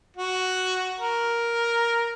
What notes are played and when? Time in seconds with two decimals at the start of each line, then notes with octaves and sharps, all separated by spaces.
0.16 F#4
1.00 A#4